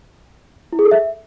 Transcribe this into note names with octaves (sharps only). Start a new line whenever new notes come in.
E4
G#4
A4
E5